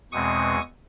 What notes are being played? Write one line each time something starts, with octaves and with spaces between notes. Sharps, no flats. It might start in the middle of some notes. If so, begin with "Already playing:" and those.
E2 B2 G#3 C4 C#6 D#6